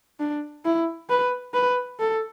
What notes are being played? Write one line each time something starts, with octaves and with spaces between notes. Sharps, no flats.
D4
E4
B4
B4
A4